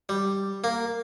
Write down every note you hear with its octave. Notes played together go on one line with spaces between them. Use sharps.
G3
A#3